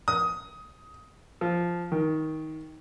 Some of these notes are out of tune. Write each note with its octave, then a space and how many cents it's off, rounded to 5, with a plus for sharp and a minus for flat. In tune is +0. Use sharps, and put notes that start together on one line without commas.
D#6 +15
F3 -5
D#3 +15